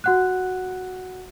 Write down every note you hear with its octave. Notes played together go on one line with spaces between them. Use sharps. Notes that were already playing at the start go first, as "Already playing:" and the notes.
F#4 F#5 F#6